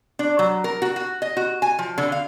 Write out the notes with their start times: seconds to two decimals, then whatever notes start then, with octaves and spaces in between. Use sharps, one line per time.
0.19 D4
0.39 F#3
0.64 A#4
0.82 F#4
0.96 F#4
1.22 D#5
1.37 F#4
1.62 G#5
1.79 F3
1.98 D3
2.12 F5